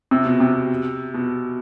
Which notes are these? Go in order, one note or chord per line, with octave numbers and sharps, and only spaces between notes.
C3
B2
C3
B2